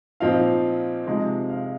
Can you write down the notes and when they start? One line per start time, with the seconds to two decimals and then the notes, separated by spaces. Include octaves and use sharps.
0.20 A#2 F3 C4 D#4 F5
1.07 C3 F3 G#3 D#4
1.49 F5